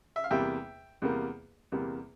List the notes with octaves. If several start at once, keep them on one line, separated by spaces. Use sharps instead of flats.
E5
F5
E2 C3 G3 A#3 E5 G5
E2 C3 G3 A#3
E2 C3 G3 A#3